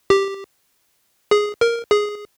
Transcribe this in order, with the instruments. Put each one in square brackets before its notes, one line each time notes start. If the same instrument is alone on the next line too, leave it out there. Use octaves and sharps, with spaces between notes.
[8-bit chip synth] G4
G#4
A#4
G#4